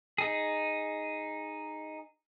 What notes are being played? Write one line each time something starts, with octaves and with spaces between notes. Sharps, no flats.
D#4 G#4